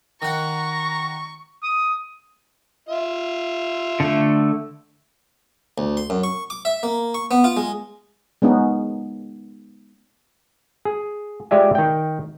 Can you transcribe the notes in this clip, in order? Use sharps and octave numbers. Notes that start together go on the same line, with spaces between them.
D#3 F#5 A#5 C#6
D#6
F4 E5
D3 A3
D2
C6
F#2
C#6
D6
E5
A#3
C#6
B3
F4
G#3
G#3 B3 C#4 D#4
G#4
G#3 F4 G4 D5 E5 G#5
D#3 G5